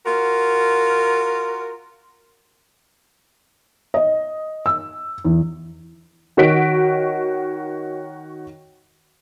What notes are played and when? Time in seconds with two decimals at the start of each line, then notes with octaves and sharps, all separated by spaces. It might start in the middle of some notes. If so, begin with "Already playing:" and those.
0.06 F4 F#4 A#4
3.94 D#5
4.66 E6
5.25 E2
6.37 D#3 F#4 C#5 B6 D7